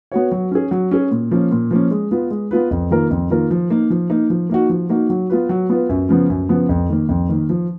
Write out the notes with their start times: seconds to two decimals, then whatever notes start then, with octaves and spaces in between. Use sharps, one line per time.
0.12 B3 F#4 C#5
0.32 F#3
0.51 C#4 G#4
0.71 F#3
0.91 C#4 G#4
1.11 A#2
1.31 F3 A#3 C#4
1.51 A#2
1.71 F3 A#3 C#4
1.91 G#3
2.11 B3 F4 B4
2.30 G#3
2.51 B3 F4 B4
2.71 F2
2.91 D#3 A#3 F4 A#4
3.11 F2
3.30 D#3 A#3 F4 A#4
3.51 F3
3.70 A#3 D#4
3.90 F3
4.10 A#3 D#4
4.30 F3
4.50 A#3 D#4 F#4
4.69 F3
4.90 A#3 D#4 F#4
5.10 F#3
5.30 B3 F4 B4
5.49 F#3
5.70 B3 F4 B4
5.89 F#2
6.09 C#3 F3 B3
6.30 F#2
6.49 C#3 F3 B3
6.69 F2
6.89 D#3 A#3
7.09 F2
7.29 D#3 A#3
7.49 F3